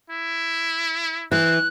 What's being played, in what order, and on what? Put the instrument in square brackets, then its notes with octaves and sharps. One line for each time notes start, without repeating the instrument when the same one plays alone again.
[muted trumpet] E4
[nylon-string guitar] E3 [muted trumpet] C4 [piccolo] F#6